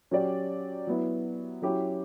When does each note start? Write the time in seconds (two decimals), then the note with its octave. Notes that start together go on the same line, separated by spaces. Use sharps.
0.11 F#3 C#4 G4 D5
0.87 F#3 B3 E4
1.62 F#3 C#4 E4 G4